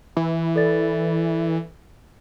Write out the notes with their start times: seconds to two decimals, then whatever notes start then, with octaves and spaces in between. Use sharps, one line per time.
0.17 E3
0.55 A4 D5 A6